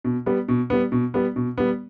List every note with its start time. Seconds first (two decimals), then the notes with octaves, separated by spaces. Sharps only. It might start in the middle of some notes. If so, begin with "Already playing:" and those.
0.04 B2
0.26 G3 B3
0.48 B2
0.70 G3 B3
0.92 B2
1.14 G3 B3
1.36 B2
1.58 G3 B3